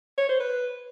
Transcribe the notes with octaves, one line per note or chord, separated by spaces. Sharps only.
C#5
C5
B4